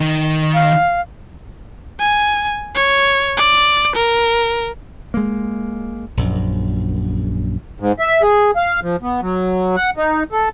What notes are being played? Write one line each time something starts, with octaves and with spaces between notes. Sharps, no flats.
D#3
F5
G#5
C#5
D5
A#4
G#3 A#3
A#1 F#2
G#2
E5
G#4
F5
F3
B3
F#3
F#5
D#4
A4